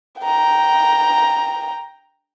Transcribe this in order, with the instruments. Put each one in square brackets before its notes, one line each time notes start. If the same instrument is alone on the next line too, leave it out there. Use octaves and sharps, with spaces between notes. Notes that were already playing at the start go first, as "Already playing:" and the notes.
[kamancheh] G5 A#5